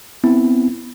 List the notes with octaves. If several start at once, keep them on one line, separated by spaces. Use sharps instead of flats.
B3 C4 E4